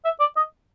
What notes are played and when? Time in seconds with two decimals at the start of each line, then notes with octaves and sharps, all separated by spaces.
0.05 E5
0.20 D5
0.37 D#5